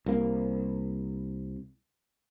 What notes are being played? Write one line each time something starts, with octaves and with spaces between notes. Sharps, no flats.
C2 A#3